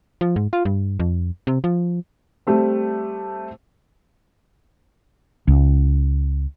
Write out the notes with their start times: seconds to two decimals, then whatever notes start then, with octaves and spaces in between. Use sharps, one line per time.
0.21 F3
0.36 G#2
0.53 F4
0.65 G2
0.99 F2
1.47 C3
1.64 F3
2.47 G3 A3 C4
5.48 C#2